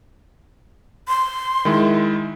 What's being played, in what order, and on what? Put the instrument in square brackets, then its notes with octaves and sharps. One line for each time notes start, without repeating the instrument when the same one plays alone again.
[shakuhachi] C6
[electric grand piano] D#3 G#3 E4